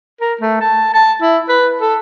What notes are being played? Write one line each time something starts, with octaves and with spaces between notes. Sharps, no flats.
A#4
A3
A5
A5
E4
B4
A4